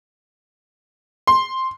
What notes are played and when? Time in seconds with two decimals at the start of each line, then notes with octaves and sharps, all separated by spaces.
1.27 C6